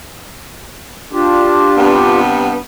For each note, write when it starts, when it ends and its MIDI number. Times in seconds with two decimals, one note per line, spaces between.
1.13 2.20 62
1.13 2.20 65
1.13 2.20 67
1.77 2.56 43
1.77 2.56 48
1.77 2.56 59